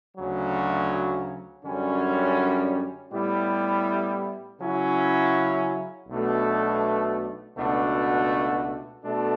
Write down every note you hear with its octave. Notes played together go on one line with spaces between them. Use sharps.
D2 C#3 F#3
F#2 D3 G3 C#4
A2 G3 B3 E4 G4
C#3 F#3 C#4 E4
B1 B2 A3 D4
C#2 B2 A3 D4 F#4
B2 A3 D4 A4